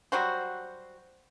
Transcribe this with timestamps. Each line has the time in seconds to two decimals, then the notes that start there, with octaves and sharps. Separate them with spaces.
0.12 F#3 G3 F#4 C5